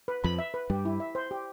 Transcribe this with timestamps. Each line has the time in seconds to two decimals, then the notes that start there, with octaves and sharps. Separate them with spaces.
0.08 B4
0.24 F2 F3 B5
0.39 E5
0.54 B4
0.70 G2 G3 G4
0.85 E4
1.00 E5
1.15 C5
1.31 G4